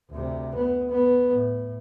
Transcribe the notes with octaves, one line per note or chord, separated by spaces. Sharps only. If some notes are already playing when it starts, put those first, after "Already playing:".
D2 C3
B3
B3
A2